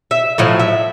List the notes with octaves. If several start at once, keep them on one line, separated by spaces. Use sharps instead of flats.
E5
A2 F3 F#3
E5